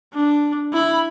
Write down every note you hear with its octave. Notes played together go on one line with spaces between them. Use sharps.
D4
E4 B5